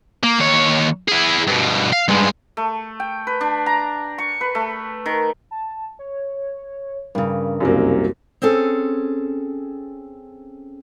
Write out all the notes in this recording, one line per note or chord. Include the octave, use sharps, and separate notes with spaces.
A#3
D#2 C#5
E4 G#4
G2 B2
F5
G2 G#3
A3
G5
B4
D4
A#5
C#6
B4
A3
D#3
A5
C#5
G2 C#3 A#4
C2 F#2 F#3 A#3
C4 C#4 G#4 A4